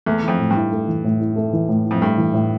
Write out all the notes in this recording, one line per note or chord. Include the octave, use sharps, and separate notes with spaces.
E2 A3
E3
F2
A2
G2
E4
A3
E3
A2
E4
A3
E3
A2
E4
F2
G2 A3
E3
A2